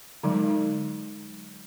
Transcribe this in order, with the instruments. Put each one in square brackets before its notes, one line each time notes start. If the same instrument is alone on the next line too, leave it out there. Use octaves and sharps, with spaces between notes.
[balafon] D3 F#3 G#3 D#4